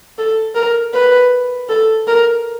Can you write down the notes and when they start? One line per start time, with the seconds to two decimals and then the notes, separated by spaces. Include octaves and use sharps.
0.18 A4
0.55 A#4
0.94 B4
1.69 A4
2.08 A#4